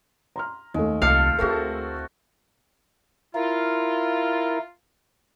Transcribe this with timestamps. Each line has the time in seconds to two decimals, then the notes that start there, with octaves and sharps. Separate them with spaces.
0.36 A#5 C6 F6
0.74 D#2 G#3 A3
1.02 C2 F4 G4 A4 F5
1.39 D2 A3 C4 E4 F#4 G#4 A#4
3.35 E4 F4 A#4